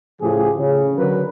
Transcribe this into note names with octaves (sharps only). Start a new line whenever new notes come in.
A2 C#3 F3 G4 G#4
C#3
D3 F#3 A#4 B4